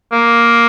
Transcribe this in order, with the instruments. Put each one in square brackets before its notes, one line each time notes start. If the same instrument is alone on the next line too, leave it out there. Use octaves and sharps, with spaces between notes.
[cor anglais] A#3